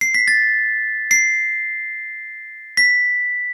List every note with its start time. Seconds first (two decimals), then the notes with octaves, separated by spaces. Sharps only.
0.01 C7
0.14 B6
0.28 A6
1.11 C7
2.77 B6